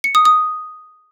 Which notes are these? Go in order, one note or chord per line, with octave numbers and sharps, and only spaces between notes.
C#7
D#6
D#6